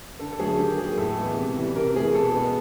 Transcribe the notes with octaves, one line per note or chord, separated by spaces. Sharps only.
D3 A4
A4
F#3 A3 G#4
D#3 G4
F#3 A#3 G#4
A2 A4
E3 G#3 B3
C3
E3 G3
C3 A#4
E3 A3 G#4
B2 A4
G#3 B3